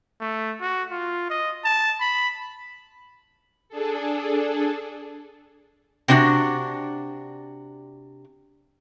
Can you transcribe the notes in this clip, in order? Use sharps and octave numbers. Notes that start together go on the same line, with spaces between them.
A3
F#4
F4
D#5
A5
B5
D4 G#4 A4
C3 D4 F#4